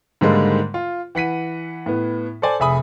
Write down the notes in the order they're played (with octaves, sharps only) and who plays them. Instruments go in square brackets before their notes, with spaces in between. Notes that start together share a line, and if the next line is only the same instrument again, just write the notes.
[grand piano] G#2 D3 D#3 G3 G#3 A#3
F4
E3 F#5 B6 D#7
A2 B3
A4 C5 D5 G#5
F1 G#4 E5 G#5 B5 D#6